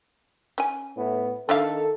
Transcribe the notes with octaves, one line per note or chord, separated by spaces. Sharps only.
C#4 G#5
A2 B3
D#3 D4 A4 E5 F5